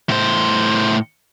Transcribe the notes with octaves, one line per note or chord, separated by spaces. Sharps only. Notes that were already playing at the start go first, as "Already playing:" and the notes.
A2 C5